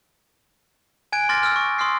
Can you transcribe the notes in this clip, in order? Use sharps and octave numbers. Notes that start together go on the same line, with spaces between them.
G#5 F#6 G#6 D7
C6 D6 F6 A6 A#6
E6 F6
C#6
C6 D#6 F6 C7